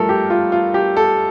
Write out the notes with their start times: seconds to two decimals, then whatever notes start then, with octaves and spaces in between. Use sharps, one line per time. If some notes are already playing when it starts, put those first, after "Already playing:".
Already playing: G2 F3 A3 A4 A#4
0.09 G4
0.30 F4
0.52 F4
0.74 G4
0.97 A4